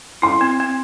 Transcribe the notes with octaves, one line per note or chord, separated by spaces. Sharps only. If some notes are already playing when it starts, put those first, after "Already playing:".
E4 C6
C4
C4